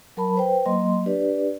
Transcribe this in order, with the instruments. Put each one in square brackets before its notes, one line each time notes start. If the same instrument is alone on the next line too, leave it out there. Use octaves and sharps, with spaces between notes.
[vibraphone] F#3 A#4 A5 B5
B4 C5 G5
F#3 A#3 D#5 C6
D4 G4 B4 D5